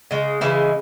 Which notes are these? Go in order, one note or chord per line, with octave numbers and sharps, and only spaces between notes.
C#3 G#3
C#3 E3 G#3 E4